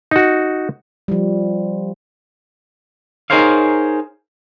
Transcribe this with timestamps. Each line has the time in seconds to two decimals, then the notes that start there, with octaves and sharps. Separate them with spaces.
0.11 D#4 F#4
1.08 F3 G3
3.30 D#4 G#4 A#4 C5 C#5 F5